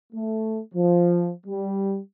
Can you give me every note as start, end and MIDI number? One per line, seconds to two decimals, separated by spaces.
0.13 0.60 57
0.75 1.30 53
1.47 1.99 55